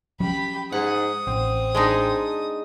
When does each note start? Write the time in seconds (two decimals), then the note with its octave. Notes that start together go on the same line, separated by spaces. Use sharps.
0.20 F3 F#3 C#4 G4 B5
0.72 G#2 F#5 D#6
1.27 A1 C4
1.75 G#3 D4 D#4